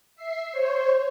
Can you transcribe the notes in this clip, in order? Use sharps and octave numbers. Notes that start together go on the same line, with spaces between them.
E5 C7
C5 C#5